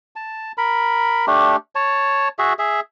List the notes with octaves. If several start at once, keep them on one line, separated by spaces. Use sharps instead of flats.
A5
A#4 B5
A3 D4 G4
C#5 A5
F#4 G#4 E5
G#4 E5